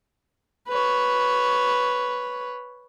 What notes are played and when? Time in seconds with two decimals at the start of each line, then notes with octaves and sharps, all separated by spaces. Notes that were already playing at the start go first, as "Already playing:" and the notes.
0.69 B4 C#5